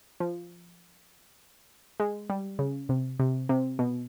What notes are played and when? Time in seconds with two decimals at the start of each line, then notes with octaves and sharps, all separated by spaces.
0.20 F3
2.00 G#3
2.30 G3
2.59 C#3
2.89 C3
3.19 C3
3.49 C3
3.79 B2